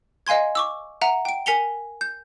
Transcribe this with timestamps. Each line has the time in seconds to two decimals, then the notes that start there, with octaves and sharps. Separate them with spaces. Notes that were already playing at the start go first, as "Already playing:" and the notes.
0.27 D#5 F5 G#5 C6 G#6
0.55 C#6 D6 E6
1.01 E5 F#5 A#5
1.25 G5 D7
1.46 A#4 G#5 B6 C#7 F7 G7
2.01 G6